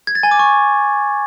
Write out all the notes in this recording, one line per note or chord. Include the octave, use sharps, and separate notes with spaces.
G#6
A6
G#5
D6
C#6